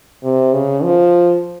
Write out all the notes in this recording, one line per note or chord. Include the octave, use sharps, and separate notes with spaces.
C3
C#3
F3